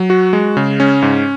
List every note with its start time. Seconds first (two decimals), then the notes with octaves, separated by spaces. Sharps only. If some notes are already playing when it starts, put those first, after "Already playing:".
Already playing: F#3
0.10 F#4
0.33 G#3
0.57 C#3
0.80 C#4
1.02 G#2